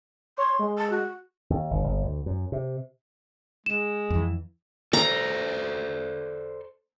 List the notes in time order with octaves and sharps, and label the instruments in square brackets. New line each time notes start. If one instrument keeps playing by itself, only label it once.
[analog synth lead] C#5 [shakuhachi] C6
[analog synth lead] G#3
[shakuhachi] A5
F#4
[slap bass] D#2
G1
G1
D2
F#2
C3
[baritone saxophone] G#3 [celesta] E7
[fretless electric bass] F2 E3
[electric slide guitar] A4 C5 D5 [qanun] A#5